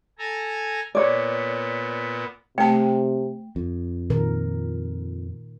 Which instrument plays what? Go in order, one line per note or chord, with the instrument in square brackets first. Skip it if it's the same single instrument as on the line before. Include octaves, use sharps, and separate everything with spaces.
[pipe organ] A4 G#5 A#5
[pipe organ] A#2 B3 [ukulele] C#5 D5
[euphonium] C3 [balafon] A3 A5 [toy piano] G5
[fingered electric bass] F2
[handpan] A#2 D#3 A#4